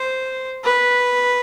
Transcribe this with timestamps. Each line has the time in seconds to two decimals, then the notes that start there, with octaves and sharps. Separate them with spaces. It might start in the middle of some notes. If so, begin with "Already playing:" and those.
Already playing: C5
0.64 B4